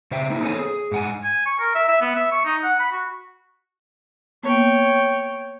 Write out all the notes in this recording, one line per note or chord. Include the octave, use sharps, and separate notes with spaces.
C#3 C5 E5 G5
A3 A#3 D#4 E4
B3 C#4 A4 C5 C#5 G#5
G#4
G#2 F#5 G#5
G#5
C#6
A#4
E5
E5
B3
E5
C#6
D#4
F#5
B5
F#4
A#3 B3 C#5 G5